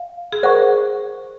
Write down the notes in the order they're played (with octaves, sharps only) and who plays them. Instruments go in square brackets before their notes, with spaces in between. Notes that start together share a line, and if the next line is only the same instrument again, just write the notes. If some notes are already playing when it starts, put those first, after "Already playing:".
Already playing: [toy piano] F5
[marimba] G#4
[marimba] A#4 [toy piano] C5 F#5 C#6